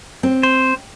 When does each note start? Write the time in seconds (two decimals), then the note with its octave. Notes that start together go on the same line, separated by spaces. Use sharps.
0.23 C4
0.43 C5